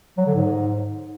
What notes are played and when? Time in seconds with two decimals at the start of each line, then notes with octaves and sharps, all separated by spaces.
0.17 F#3
0.26 D3
0.35 G#2